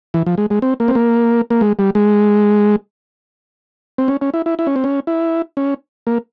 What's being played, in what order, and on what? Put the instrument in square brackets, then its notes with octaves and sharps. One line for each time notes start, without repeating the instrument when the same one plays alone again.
[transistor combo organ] E3
F3
G#3
G#3
C4
A#3
C4
A#3
A#3
G#3
G3
G#3
C4
C#4
C#4
E4
E4
E4
C#4
C4
C#4
E4
C#4
A#3